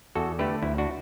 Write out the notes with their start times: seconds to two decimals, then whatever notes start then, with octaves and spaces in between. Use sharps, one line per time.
0.15 E2 F#4 A4
0.39 D3 A3 G4 B4
0.62 D2 E4
0.78 D4 F#4